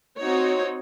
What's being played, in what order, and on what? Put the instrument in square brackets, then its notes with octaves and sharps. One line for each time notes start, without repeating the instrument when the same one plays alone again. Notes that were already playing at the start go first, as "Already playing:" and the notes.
[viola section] C4 D#4 F#4 C#5